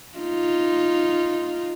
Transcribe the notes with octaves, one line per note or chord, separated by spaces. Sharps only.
D#4 F4